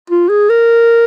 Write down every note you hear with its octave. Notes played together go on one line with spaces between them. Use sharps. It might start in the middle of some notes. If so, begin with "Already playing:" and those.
F4
G#4
A#4